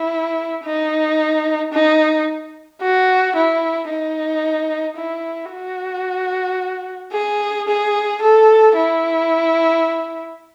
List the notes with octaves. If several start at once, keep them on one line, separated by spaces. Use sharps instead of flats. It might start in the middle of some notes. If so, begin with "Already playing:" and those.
Already playing: E4
D#4
D#4
F#4
E4
D#4
E4
F#4
G#4
G#4
A4
E4